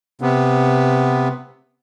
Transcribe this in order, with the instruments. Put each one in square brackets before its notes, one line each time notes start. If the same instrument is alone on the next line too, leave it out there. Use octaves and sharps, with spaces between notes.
[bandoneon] C3 B3